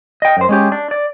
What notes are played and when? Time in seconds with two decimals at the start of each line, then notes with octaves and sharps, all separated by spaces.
0.22 D#5 G5
0.37 F#2 C5
0.49 G#3 C#4 G4
0.72 D4
0.91 D5